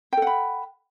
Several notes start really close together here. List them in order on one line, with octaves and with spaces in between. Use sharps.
G5 A4 F#5 B5